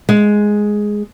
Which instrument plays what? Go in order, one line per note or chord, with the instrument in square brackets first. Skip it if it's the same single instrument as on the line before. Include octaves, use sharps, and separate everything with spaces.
[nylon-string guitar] G#3